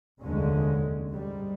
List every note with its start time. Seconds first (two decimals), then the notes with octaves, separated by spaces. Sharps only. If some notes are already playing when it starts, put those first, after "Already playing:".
0.22 F1 A#1 D#2 D3 G#3 C#4
1.12 G#2 G3